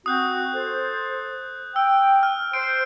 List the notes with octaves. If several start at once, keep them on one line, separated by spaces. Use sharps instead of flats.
C4 F#4 D#6 F#6 G6
A4 C5
G5 E6
F6
C5 D7